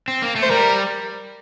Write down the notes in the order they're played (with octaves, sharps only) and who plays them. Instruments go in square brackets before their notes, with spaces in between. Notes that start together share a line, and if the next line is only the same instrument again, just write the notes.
[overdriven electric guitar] C4
A#3
A3
[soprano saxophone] C5
[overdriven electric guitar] G3 [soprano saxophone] A#4